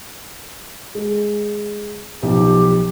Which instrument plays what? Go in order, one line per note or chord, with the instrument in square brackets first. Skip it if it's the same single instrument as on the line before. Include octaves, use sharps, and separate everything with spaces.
[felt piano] G#3
[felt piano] B1 F3 [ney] G4